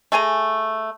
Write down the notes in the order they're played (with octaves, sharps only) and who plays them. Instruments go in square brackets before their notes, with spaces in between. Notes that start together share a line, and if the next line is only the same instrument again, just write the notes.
[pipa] A3 G#4 G#5 A#5